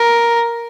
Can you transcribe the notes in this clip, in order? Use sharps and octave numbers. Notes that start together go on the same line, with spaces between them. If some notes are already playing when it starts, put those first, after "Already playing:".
Already playing: A#4